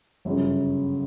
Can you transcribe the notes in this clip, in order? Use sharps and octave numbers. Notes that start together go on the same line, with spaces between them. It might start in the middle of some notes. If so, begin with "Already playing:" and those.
G1 F#2 C#3